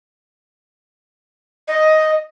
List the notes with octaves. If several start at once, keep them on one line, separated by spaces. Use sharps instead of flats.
D#5